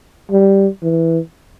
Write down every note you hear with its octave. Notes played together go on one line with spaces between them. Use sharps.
G3
E3